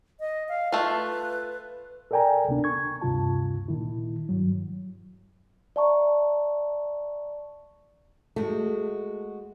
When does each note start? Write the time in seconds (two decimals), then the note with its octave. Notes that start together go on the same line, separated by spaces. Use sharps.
0.20 D#5
0.49 F5
0.72 A3 F4 B4
2.11 A4 A#4 D5 G5 G#5 A#5
2.47 D2 C3 B3 D4
2.64 C#6 G#6
3.01 D2 G2 C3 F4 A5
3.68 A#2 D#3 E4
4.29 G2 F#3
5.76 D5 E5 A5 A#5 C#6
8.36 G#3 A3 F#4